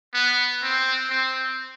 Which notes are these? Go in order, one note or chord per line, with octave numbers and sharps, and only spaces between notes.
B3
C4
C4